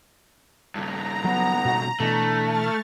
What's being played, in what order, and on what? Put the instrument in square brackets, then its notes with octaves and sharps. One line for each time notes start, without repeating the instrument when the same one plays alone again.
[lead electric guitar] G2 C#3 [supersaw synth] A#5
[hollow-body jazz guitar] F#3 [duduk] B3
[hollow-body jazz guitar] B2 F#4 F#5
[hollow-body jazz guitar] B2 E3 [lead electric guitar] A3 [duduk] D4
[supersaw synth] C#6 F6 A6